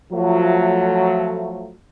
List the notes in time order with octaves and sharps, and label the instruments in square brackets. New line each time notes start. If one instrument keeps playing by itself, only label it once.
[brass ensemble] F3 F#3 A3